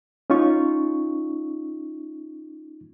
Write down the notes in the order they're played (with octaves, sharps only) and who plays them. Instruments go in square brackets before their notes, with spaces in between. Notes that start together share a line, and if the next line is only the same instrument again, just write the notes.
[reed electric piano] C#4 D#4 F4 C#6